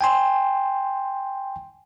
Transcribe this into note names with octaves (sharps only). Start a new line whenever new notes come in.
G5 G#5 C6